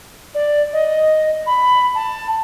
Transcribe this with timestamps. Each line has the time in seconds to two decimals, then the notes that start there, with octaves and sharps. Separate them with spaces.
0.35 D5
0.73 D#5
1.46 B5
1.95 A5